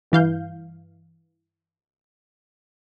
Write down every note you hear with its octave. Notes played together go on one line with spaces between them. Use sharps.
G2 E3 F5 G6